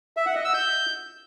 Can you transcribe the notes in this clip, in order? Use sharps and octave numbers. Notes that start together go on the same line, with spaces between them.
E5
F#5
D#5
E6
G6